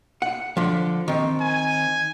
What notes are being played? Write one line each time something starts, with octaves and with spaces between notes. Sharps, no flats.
F#5
D3 F3
D#3 C4
G#5